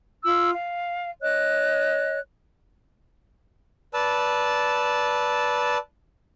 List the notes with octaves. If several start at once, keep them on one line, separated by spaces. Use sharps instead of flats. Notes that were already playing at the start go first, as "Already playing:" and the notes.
F4 E6
F5
C#5 D#5 F#6
B4 D5 A5 E6